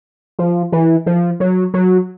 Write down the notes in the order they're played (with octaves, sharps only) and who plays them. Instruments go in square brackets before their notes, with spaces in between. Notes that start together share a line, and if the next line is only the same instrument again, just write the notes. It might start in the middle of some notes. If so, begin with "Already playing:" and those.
[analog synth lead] F3
E3
F3
F#3
F#3